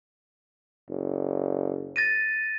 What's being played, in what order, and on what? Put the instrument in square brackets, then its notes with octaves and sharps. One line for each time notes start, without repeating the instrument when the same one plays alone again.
[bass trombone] F#1
[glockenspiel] A6 A#6 D#7